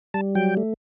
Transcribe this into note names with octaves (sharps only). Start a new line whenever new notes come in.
G3 A5
F#3 G5
A3